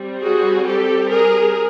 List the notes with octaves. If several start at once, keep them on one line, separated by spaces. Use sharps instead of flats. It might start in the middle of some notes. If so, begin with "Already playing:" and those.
Already playing: G3 C4
F#4 G#4
G4 A4
G#4 A#4